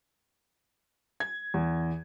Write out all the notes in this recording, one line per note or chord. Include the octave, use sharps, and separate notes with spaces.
G#6
E2